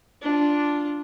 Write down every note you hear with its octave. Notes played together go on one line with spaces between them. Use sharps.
D4 F4